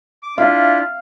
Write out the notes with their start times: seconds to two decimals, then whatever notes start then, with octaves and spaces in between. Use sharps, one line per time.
0.23 D6
0.38 D4 E4 F4 F5